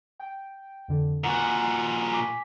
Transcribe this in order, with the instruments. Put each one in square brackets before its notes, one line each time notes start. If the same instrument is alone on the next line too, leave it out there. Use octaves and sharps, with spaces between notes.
[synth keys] G5
F2 D3
[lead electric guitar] A#2 F#4 [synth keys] F#5 G#5
[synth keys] G#5 D6 B6